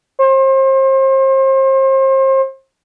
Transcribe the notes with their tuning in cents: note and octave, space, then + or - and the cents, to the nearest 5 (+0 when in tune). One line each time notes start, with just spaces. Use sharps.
C5 +35